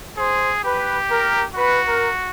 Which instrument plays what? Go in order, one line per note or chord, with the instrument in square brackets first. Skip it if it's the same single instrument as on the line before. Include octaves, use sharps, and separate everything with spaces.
[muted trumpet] G#4 [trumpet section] C5
[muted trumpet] G4 [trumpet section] B4
[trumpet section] A#4
[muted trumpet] F#4 [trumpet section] B4
[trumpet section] A#4